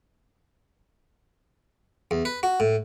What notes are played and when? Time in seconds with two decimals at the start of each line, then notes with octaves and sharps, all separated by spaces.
2.11 E2
2.25 B4
2.43 F#4
2.60 A2